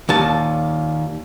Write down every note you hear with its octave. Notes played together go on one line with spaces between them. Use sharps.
D#2 A#2 A5